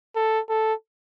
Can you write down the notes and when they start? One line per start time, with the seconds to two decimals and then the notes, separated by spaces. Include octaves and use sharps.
0.15 A4
0.49 A4